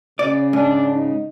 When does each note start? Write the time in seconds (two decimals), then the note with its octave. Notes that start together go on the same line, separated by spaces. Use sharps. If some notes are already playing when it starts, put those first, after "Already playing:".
0.19 C#3 D5
0.53 G#2 D4
0.92 D#4